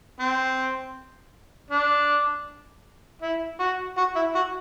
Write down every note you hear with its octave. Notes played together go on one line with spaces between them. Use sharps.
C4
D4
E4
F#4
F#4
E4
F#4